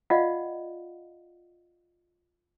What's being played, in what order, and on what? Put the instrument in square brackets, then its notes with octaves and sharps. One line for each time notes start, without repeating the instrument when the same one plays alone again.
[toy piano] F4 D5 D#5 F5 F#5